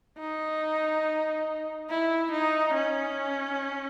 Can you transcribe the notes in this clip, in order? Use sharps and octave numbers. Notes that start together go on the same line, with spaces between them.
D#4
E4
D#4
C#4